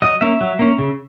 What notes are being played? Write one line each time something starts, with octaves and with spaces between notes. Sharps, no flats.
F#3 D#5
A#3 C#4 E5
F#3
A#3 C#4
C#3